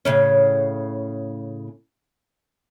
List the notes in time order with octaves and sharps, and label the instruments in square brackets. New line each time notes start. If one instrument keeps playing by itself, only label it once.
[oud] A2 C#3 C#4